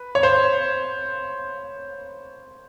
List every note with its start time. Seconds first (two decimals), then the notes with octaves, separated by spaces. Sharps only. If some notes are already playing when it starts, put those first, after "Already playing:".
Already playing: B4
0.15 C#5
0.23 C5